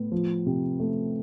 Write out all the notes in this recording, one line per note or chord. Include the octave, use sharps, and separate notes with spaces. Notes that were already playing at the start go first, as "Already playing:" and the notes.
Already playing: A2 B3
F3
C3
A3